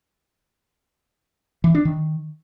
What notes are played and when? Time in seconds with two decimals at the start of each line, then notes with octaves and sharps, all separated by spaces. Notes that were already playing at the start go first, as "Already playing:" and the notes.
1.64 E3
1.75 D4
1.85 D#3